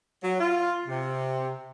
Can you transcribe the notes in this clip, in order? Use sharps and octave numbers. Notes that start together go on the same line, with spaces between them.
F#3
F4
C3